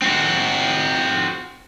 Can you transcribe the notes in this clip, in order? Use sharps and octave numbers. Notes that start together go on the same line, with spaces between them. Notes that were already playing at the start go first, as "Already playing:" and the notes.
C4 F#4